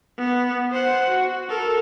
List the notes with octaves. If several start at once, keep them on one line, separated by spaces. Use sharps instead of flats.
B3
C5 F#5
F#4
A4 A#4